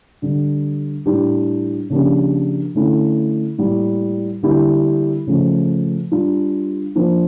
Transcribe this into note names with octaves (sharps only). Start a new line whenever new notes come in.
D3 G3 D4
A2 G3 D4 G4
C#3 F3 A#3 D4 G4
D3 A3 C#4 E4
A2 G3 A#3
D3 G3 A#3 E4 G4
C#3 F3 A3
G3 D4 F4
F3 A#3 D4